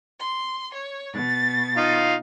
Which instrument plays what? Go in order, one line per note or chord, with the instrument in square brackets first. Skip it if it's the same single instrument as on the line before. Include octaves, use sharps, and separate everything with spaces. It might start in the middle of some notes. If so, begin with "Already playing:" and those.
[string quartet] C6
C#5
B2 A6
[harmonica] D#4 F4 F5